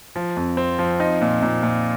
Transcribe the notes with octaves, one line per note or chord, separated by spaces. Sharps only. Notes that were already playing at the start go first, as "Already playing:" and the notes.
F3
F2
C4
F3
D#4
A#2
A#2
A#2